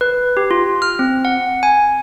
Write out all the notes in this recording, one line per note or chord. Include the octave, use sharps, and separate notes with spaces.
B4
G4
F4
F6
C4
F#5
G#5